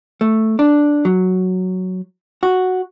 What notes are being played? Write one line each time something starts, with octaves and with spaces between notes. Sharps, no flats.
A3
D4
F#3
F#4